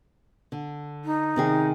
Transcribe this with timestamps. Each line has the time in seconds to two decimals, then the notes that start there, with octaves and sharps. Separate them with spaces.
0.52 D3
1.04 D#4
1.36 C3 D#3 G#4